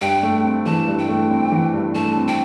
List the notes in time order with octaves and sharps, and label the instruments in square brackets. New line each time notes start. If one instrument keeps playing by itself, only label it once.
[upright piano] G2 [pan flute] G5
[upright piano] A3
C4
[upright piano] E3 [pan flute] A5
[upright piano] G2
[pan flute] G5
[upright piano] A3
C4
E3
G2
[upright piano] A3 [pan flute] A5
[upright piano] C4
[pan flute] G5